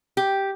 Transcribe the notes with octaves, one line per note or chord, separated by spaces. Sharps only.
G4